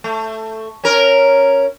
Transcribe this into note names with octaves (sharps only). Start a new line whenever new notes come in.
A3
C#4 A#4